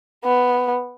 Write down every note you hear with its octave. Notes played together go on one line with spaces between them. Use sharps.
B3